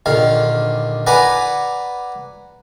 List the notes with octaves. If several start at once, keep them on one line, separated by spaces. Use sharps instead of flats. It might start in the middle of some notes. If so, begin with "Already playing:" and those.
A#1 D3 D#3 F5
B4 D5 F#5 G#5 A#5 B5